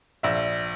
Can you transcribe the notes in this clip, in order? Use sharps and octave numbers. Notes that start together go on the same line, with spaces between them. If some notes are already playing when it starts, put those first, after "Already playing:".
A#1 E5